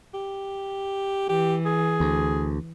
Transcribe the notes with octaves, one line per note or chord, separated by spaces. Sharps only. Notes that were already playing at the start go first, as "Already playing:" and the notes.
G4
E3 G4
G#4
D2